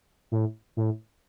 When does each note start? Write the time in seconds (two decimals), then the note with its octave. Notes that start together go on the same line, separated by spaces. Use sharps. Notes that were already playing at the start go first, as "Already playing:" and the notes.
0.32 A2
0.77 A2